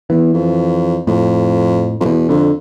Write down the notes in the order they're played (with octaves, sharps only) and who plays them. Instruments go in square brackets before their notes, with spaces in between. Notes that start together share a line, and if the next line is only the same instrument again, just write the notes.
[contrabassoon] E2 [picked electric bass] E3
[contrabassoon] F2
[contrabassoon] F2 [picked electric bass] A2
[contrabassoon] F2
[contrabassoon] E2 [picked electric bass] B2
[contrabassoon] F2 [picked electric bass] D3